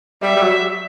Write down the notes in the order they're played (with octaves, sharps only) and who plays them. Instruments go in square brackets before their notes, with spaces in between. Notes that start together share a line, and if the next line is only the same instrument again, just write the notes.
[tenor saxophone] G3 [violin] E5
[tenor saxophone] G3
F#3